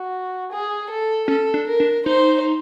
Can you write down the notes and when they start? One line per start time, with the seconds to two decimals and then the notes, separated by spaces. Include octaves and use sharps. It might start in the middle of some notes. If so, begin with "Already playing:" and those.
Already playing: F#4
0.52 G#4
0.90 A4
1.28 C#4 A4
1.54 D4
1.67 A#4
1.80 D4
2.05 D#4 C5